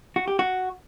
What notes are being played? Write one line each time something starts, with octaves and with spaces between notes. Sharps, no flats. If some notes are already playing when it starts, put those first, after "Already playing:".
F#4
G4
F#4